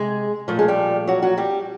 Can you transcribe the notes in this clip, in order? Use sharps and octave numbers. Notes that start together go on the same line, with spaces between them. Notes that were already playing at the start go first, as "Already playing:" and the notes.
Already playing: C3 G#3 G#4
A#2 F3 A3
G#3 G#4
G3 G4
F#3 F#4
F#3 F#4
G3 G4